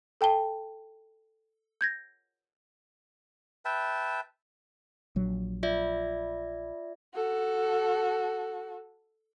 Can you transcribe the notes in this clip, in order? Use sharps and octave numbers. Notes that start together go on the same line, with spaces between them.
A4 G5 A5 G7
G6 G#6 A#6
B4 E5 G5 A5
A#1 F#3
F4 D5 E5
F#4 A4